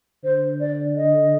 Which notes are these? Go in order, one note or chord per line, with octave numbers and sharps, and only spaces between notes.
D3 C5
D5
D#5